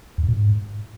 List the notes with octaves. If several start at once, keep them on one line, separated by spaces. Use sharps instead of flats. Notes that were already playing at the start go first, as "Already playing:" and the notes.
E2
F#2
A#2
G#2